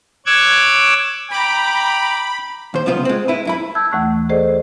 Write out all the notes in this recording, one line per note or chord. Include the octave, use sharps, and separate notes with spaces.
C#5 D6 E6 F#6 G#6
G5 A#5 B5 D6
D#2 C5
C2 F#2 C#3 B3 F4 C5
G#3 C4
E4 B4
F#2 E4 B5
A5 E6 G6 G#6
D#2 E3 A3 C#6 F#6
G#4 A4 C5 D5 D#5